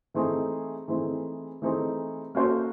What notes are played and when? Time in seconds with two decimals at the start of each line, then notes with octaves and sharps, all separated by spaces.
0.14 E3 A3 C4 D#4 G#4
0.88 E3 A3 C4 D#4 G#4
1.62 E3 A3 C4 D#4 G#4
2.35 A#3 C#4 F#4 A4 C5